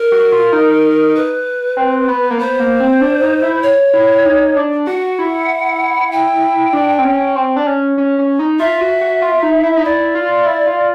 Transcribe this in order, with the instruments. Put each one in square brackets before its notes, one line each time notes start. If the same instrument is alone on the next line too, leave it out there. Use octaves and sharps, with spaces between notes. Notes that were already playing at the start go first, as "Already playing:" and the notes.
Already playing: [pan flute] A#4
[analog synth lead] F#4
F4
D#4
[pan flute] B4
[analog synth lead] C4
B3
A#3
[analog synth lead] B3 [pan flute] C5
[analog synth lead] A#3
C4
D4
D#4
E4
[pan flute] C#5
[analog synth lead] E4
D#4
D4
[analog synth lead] F#4 [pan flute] F#5
[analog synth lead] E4
[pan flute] G5
[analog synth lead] D4
C4
C#4
C4
D4
C#4
C#4
C#4
D#4
[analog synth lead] F4 [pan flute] E5
[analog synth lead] F#4
F#4
F4
D#4
E4
D#4
[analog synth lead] E4 [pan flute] D5
[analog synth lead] F4
E4
F4